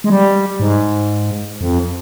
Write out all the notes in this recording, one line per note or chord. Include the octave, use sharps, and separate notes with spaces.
G#3
G3
G#2
F2